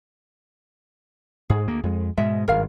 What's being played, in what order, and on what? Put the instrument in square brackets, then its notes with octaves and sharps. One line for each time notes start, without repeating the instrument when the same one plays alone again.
[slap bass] G#2 [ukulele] G#4
[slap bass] D2 A#3
F2 G#3
[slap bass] G#2 B2 G#3 [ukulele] E5
[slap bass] G#1 G2 [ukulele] A#4 F5